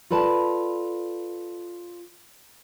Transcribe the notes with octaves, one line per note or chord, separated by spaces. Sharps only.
F4 A4 B4 D5 A5